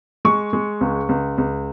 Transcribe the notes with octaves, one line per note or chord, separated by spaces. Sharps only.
G#3 C#6
G#3
C#2
C#2
C#2